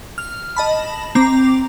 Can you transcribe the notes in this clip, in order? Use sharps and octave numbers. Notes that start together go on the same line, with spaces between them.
F6
D#5 A5 B5
C4 A#5 D6